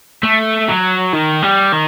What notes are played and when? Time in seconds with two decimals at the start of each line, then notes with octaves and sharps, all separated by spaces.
0.23 A3
0.68 F#3
1.13 D#3
1.43 G3
1.72 D#3